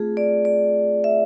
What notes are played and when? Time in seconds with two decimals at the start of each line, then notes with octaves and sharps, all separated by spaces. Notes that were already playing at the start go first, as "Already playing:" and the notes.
Already playing: A3 C4 F4 G#4
0.17 D5
0.45 D5
1.04 E5